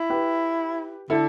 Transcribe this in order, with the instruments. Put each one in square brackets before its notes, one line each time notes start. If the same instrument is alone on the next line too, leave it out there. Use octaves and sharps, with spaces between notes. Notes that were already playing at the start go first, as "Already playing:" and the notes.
Already playing: [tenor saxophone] E4
[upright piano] G4 B4
[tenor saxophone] D3 [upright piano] E4 A4